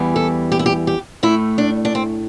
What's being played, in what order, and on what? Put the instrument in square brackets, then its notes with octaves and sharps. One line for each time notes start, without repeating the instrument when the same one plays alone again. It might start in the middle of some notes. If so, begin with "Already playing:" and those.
Already playing: [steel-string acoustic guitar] E2 E3 G3
A4
G4
E4
G4
G4
A2 A3 E4
D4
D4
C4